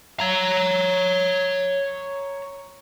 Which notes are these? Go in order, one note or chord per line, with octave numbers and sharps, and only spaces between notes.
C#5 A#5